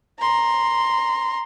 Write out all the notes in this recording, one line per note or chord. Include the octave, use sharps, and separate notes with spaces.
A#5 C6